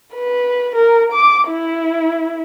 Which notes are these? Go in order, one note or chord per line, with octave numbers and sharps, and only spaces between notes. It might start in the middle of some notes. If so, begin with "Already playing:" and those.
B4
A#4
D6
E4